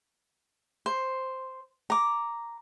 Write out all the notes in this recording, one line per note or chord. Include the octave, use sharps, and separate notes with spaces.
C5
A#5 D6